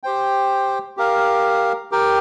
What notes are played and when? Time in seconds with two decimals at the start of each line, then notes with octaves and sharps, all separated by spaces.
0.03 G4 C5 G5
0.97 G4 A#4 F5
1.91 G4 A#4 G5